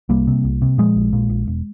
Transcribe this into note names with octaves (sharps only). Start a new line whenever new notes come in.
C2 G3 A#3
C3
C2
C3
A#2 F3 G#3
A#1
A#2
A#1
E1